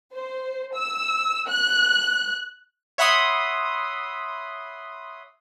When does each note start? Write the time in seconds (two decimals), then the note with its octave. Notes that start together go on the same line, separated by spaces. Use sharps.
0.14 C5
0.75 E6
1.49 F#6
2.98 C#5 E5 F#5 B5 C6 D#6